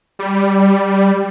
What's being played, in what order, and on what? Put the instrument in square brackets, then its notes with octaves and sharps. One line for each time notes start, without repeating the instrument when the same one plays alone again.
[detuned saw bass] G3